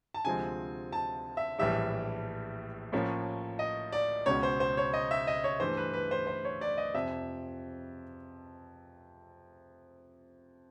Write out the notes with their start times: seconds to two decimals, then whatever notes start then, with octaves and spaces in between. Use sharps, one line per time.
0.14 A5
0.25 D2 C3 F3 G#3 C4 G#5
0.93 A5
1.37 E5
1.58 A#1 A2 E3 G3 E5
2.92 A2 F3 A#3 C#4
3.59 D#5
3.92 D5
4.26 C#2 B2 G#3 C#4 C#5
4.43 C5
4.60 C5
4.77 C#5
4.93 D#5
5.11 E5
5.27 D#5
5.44 C#5
5.60 G2 E3 A3 C5
5.77 B4
5.94 B4
6.11 C5
6.27 C5
6.45 C#5
6.61 D5
6.78 D#5
6.94 F2 C3 F3 E5